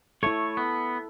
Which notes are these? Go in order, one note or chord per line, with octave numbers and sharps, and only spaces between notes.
A3 E4 A4 C#5
B3